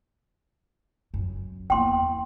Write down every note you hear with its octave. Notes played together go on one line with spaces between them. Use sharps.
F#2
E2 A#3 G5 C6